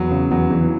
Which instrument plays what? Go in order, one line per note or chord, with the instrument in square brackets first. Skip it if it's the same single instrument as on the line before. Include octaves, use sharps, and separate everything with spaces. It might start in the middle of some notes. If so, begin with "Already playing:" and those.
Already playing: [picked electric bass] E2 [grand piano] F#3
[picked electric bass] C#3
[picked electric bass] E2 [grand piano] F#3
[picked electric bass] E2 [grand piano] E3